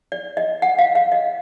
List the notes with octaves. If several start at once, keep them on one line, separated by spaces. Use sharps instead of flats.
D5
D#5
F#5
F5
F5
D#5